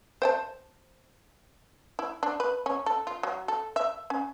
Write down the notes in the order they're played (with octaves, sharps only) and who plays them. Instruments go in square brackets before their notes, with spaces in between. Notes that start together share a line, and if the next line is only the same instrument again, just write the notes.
[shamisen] C5 G5 A5
E4
D4
B4
C#4
A4
F4
F#3
A4
E5
C#4